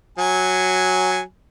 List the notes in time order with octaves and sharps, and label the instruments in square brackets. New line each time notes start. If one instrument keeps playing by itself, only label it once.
[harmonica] F#3 G#5